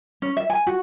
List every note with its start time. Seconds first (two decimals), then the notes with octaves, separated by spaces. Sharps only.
0.22 C#4
0.37 E5
0.50 G#5
0.67 F#4